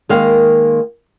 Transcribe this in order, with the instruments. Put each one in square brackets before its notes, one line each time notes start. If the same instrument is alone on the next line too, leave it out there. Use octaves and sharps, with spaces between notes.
[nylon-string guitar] D#3 G#3 A#3 F5